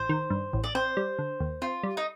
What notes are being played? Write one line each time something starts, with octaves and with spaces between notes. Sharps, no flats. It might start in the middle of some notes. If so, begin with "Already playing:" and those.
Already playing: A1 C5
D#3
G2
A1
D5
C4 C5
G3
D3
D#2
C4 F4
G3
D#4